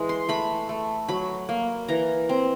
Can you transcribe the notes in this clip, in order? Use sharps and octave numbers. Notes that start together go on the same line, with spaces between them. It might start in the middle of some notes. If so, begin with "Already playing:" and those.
Already playing: E3 G#3
C6
A3 B5
A3
F#3 B5
A#3
E3 A#5
C4